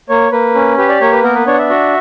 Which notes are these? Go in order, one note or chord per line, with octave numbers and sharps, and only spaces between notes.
A#3 C#5
A#3 B4
C#4
G4 B4
D5
A#3 C#5
B4
B3 A#4
B4
D4 C#5
F#5
E5
F#4